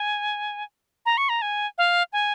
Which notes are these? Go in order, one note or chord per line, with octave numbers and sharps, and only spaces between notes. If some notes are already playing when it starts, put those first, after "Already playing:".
Already playing: G#5
A#5
C#6
A#5
G#5
F5
G#5